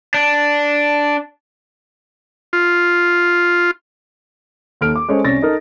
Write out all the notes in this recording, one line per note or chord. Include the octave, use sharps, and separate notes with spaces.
D4
F4
D#2 A4 F6 D7
D6
G#3 C#4 A4 C5 C#5
C2 C#4 D5 A6 A#6
D#4 A4 A#4